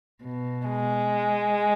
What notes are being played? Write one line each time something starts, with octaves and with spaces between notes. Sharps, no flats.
B2
G#3